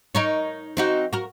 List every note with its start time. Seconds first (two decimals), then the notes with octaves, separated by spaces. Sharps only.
0.15 D#4 A#4 C#5
0.77 C4 D#4 F#4
1.13 F#4 A#4